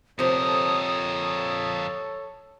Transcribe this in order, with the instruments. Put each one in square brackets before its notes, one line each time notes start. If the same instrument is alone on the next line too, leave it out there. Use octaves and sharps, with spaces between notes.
[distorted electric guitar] F2 A#4 [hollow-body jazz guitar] C3 F3 [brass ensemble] A4 C#5 [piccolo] D#6